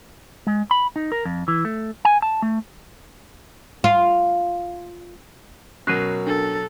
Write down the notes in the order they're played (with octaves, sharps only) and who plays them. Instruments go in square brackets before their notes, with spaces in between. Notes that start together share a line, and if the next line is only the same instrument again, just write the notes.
[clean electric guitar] G#3
B5
D#4
A#4
F2
E3
A3
G#5
A5
A3
[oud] F4
[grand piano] B2 F#3 [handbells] C#4 A#4 [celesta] F#6 C7 D#7
[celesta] D4 [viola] A4